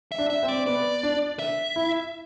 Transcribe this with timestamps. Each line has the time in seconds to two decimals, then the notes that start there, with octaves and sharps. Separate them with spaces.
0.12 E5
0.18 D4
0.30 E5
0.43 C4
0.48 D5
0.66 B3 D5
1.03 D4
1.39 E5
1.76 E4